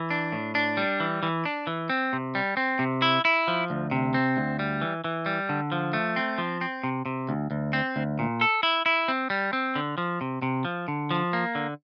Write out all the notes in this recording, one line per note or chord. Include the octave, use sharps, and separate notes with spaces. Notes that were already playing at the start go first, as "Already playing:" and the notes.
Already playing: E3
D4
A2
D4
G3
E3
E3
D4
E3
C4
C3
G3
C4
C3
E4
E4
F3
D2
C3
C4
D2
G3
E3
E3
G3
D3
F3
A3
C4
F3
C4
C3
C3
D2
D2
C4
D2
A#2
A4
E4
E4
C4
G3
C4
D3
F3
C3
C3
F3
D3
F3
A#3
D3